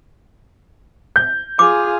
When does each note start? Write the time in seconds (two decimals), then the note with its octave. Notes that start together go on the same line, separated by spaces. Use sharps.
1.16 G6
1.59 F4 G#4 D6